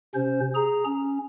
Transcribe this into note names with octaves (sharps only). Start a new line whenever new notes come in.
C3 C#4 C5
G#4 A#5
C#4